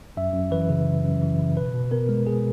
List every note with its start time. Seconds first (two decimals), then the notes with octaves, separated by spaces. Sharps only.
0.17 F#2 E5
0.34 F#2
0.51 E3 B4
0.69 C#3
0.87 F#2
1.04 F#2
1.22 E3
1.39 C#3
1.56 B2 B4
1.74 B2
1.91 B3 A#4
2.09 G#3
2.26 B2 G#4